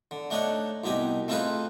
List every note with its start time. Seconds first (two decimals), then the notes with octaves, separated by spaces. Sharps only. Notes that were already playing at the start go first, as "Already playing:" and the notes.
0.11 D3
0.30 A3 D4 D#4 C#5 D#5 F#5
0.84 C2 B2 D#4 G4 G#5
1.28 A3 C4 D#4 F4 G#4 B4